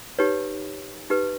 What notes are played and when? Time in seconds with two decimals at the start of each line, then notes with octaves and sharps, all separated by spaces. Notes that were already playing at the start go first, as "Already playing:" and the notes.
0.19 D#4 G4 B4 C#5
1.10 D#4 G4 B4